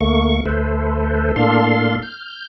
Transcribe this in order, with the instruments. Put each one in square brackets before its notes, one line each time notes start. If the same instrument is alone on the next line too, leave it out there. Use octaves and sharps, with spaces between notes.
[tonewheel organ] D2 A3 A#3 C#6
D2 A3 A4 B4 C5
A2 A#3 D4 A4 F5 C6
F6 G6